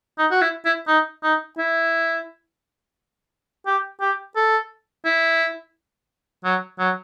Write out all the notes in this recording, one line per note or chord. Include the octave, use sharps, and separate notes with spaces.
D#4
F#4
E4
E4
D#4
D#4
E4
G4
G4
A4
E4
F#3
F#3